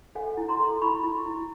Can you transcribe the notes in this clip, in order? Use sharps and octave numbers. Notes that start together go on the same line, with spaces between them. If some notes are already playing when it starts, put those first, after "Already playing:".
A4 F#5 G#5
E4
A#5 C6
A4
E4 B5 C#6
E4
E4